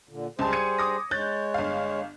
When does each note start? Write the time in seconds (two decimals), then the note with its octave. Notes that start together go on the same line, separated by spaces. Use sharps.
0.09 A#2 D3
0.39 C#2 G3 G#4 C5 A5
0.53 G#6 C#7 D#7
0.78 D6 D#6 A#6
1.11 G#3 C#5 F#6 G6 A6
1.54 G1 F5